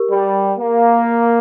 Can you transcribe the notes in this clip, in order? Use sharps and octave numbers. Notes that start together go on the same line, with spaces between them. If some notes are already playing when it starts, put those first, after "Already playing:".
Already playing: G4 A#4
G3
A#3